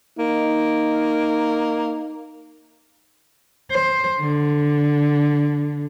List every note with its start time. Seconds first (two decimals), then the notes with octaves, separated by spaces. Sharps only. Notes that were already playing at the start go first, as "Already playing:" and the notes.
0.19 A#3 D#4
3.71 C5
4.20 D3